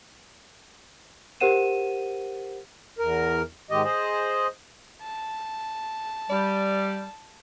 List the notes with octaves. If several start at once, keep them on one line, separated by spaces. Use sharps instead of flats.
G4 A#4 C5 F#5 D#7 E7
E2 A#4
G#2 D#3 G#3 G4 D#5
G#4 C5 D#5
A5
G3 D5